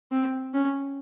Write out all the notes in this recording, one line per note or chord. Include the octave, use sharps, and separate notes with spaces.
C4
C#4